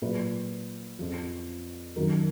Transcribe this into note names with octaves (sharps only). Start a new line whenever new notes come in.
A#2 F#3 B4
F2 F3
F#2 D#3 F#3 A#4